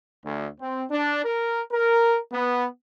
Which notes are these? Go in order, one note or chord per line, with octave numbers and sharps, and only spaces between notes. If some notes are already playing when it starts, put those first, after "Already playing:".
D2
C4
D4
A#4
A#4
B3